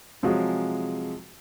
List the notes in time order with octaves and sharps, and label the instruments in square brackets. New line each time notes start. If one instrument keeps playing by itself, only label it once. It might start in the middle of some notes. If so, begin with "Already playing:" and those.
[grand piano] C3 F3 F#3 G#3 F#4 G#4